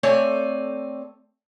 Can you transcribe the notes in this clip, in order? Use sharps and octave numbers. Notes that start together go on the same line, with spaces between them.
A3 C4 A4 C#5 D5 G#5